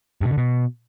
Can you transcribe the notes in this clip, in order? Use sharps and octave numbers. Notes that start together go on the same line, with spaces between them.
G2
B2
D3
B2